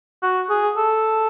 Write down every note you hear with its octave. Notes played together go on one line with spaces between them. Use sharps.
F#4
G#4
A4